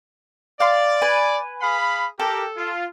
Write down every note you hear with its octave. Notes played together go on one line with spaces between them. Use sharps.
D5 F5 C6
B4 G#5
G#4 F5 B5
G4 A4 A#4
F4